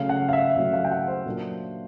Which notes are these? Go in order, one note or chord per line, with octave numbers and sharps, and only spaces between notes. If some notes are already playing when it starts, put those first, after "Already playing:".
Already playing: C#3 F#3 A3 C#4 F5
F#5
F5
E5
C#3 F#3 A3 C#4 E5
F5
G5
F#5
C5
A#2 F#3 A#3 D4